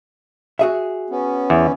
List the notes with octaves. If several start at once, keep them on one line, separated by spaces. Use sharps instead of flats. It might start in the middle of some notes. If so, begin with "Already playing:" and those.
F#4 G#4 E5
B3 C#4
E2